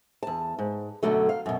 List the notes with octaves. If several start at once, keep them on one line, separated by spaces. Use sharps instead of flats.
E2 A5
G#2
F#2 B2 D3 F#3 A3
F5
F#2 B2